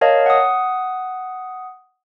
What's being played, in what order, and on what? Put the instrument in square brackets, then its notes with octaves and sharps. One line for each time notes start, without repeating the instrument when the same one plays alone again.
[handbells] A#4 C#5 D#5 F5 A5
F#5 D#6